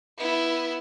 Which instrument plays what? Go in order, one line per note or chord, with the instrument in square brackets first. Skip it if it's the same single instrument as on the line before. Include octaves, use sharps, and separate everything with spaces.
[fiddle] B3 E4